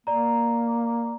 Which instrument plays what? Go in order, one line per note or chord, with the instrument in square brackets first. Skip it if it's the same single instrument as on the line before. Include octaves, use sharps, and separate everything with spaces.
[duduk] A#3 [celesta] D5 A#5